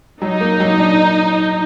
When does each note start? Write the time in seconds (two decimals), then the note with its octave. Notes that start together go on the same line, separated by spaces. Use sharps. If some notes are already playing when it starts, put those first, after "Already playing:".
0.22 F#3 D#4
0.41 A#3
0.60 F#3
0.79 D4